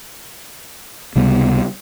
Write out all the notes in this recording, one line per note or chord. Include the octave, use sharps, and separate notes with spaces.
C#2 C3 G3 B3